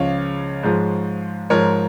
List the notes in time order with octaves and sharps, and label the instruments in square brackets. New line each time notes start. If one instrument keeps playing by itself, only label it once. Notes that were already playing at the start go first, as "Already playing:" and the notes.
Already playing: [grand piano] C#2 C#3 F3 C#5 F5
G#2 F3 G#3
G#2 F3 G#3 A#4 C#5